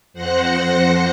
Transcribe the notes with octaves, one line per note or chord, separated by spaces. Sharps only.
F2 C5 F#5 F#6 A#6 C#7